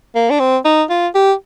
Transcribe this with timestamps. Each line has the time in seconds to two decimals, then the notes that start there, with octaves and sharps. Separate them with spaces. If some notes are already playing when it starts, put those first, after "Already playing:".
0.16 A#3
0.30 D4
0.40 C4
0.65 D#4
0.90 F4
1.15 G4